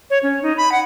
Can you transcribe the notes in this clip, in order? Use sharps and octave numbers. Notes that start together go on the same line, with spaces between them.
C#5
C#4
D#4
B5
F#5